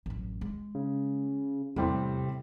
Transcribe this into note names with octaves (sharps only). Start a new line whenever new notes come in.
A1 F#2
G#3
C#3
E2 A2 C3 G3 C4